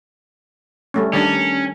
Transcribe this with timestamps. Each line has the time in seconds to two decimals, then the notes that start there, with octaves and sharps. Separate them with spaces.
0.94 G3 A3 C#4
1.13 D#3 G3 C#4 D4